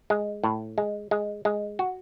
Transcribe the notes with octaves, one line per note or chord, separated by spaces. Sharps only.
G#3
A2
G#3
G#3
G#3
F#4